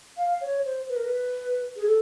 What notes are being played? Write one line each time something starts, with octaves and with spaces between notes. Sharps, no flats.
F5
C#5
C5
B4
A#4
B4
G#4
A4